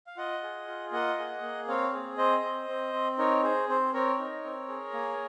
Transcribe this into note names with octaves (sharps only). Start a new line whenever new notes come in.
F5
F4 D#5 F#5
G#4
F4
A#3 D#5 F#5
G#4
A#3
C4 C#5 F5
G#4
C4 C5 D#5
C4
C4
C4
D#4 A#4 C#5
G#4 C5
C4 C5
C4 A#4 C#5
D#4
C4
G#4
A#3